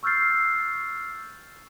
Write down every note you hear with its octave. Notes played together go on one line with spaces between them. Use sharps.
C#6 E6 F6 G6 A6 C7